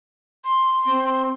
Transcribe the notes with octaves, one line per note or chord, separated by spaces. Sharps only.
C6
C4